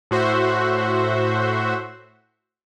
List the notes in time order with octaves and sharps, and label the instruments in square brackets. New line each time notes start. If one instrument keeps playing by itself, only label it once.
[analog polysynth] A2 F#4 C5 E5